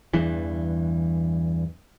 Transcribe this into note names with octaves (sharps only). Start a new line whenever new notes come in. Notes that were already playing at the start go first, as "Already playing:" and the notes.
E2 G2 E3